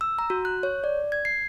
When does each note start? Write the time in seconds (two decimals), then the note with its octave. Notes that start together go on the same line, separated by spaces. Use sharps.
0.01 E6
0.19 A#5
0.30 F#4
0.45 F#6
0.63 C#5
0.84 D5
1.12 G#6
1.25 C7